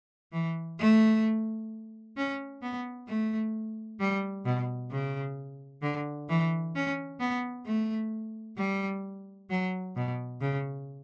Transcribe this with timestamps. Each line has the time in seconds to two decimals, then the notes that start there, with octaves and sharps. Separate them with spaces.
0.33 E3
0.79 A3
2.17 C#4
2.62 B3
3.08 A3
4.00 G3
4.46 B2
4.91 C#3
5.82 D3
6.29 E3
6.75 C#4
7.20 B3
7.66 A3
8.57 G3
9.50 F#3
9.96 B2
10.41 C#3